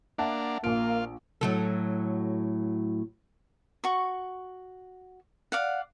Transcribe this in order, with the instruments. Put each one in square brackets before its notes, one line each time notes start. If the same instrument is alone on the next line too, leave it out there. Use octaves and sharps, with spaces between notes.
[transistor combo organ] A#3 D4 [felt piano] E5 F#5 A5
[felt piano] A#1 D7 [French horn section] A#3 [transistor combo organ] F4
[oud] A2 F#3 A4
[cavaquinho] F#4 C#6
D5 F5 F#5